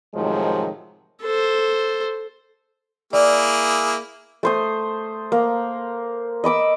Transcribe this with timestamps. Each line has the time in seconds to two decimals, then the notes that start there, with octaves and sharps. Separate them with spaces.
0.14 A2 C3 D#3 F3 F#3 G#3
1.22 A4 C5
3.13 A#3 E4 G#4 D5
4.43 A3 C5 D#6
5.32 A#3
6.44 D#5 B5 D6 E6